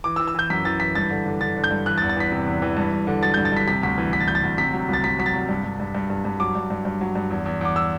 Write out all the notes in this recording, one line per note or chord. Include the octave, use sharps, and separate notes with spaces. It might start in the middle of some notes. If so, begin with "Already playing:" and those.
E3 D6
E6
E3
E6
E3 G6
F#2 B6
E3 A6
E3 B6
G2 A6
D3
D3
D3 A6
D3
G6
G2
E3 F#6
A6
E2
A6
E3 B6
C3
E2
E3
G2
G2
D3
F#3 A6
G2 G6
A6
G2 B6
C3 B6
D2 B6
E3
E3 B6
A6
D2 G6
A6
D2
C3 B6
F#3
C2 A6
C2 B6
F#3 B6
A6
C2
G2
G2
G2
G2
G2
G2
F#3 D6
G2
G2
G2
F#3
G2
E2
E2
E2 D6
E6